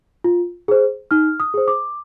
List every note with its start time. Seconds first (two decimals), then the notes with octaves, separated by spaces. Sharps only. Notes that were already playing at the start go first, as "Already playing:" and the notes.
0.24 F4
0.68 G#4 C5
1.11 D#4 F6
1.40 D#6
1.54 G#4 C5
1.68 D6